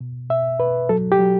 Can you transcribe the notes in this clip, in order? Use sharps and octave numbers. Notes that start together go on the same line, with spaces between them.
B2
B2 E5
B2 B4
F#3 A4
G4
F#3